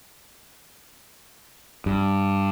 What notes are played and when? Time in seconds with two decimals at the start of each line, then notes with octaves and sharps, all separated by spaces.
1.86 G2